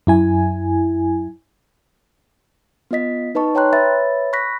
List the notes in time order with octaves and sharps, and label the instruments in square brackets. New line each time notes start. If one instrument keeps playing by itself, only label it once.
[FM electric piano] F#2 E4 G#5
[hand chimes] B3 F4 D#5 B6
D#4 B4 D#5 A5 C#6
C#5 G5 A#5 C6 F#6
B4 C#5 E5 B5 A6
B5 C#6 F#6 A#6 B6